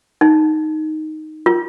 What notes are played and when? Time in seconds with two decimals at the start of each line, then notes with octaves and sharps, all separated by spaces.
0.21 D#4
1.46 F4